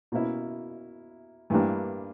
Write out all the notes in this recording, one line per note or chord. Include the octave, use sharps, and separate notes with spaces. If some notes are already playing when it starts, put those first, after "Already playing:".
B2 A#3 C#4 E4
G2 E3 G3 A#3 D4